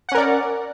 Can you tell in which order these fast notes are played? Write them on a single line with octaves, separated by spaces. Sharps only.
F#5 C#4 A#4 D5